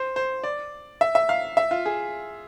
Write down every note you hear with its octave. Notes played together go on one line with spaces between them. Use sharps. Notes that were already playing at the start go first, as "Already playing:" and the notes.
Already playing: C5
C5
D5
E5
E5
F5
E5
F4
G#4